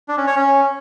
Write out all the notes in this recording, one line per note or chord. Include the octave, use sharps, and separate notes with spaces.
D4
C#4
C#5
C#4